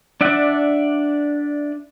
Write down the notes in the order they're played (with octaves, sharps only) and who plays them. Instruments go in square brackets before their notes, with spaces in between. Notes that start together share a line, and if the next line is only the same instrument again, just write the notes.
[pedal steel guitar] D4 D5 E5 F#5